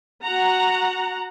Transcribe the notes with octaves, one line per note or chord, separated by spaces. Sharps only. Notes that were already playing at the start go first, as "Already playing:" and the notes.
F#4 F#5 A#5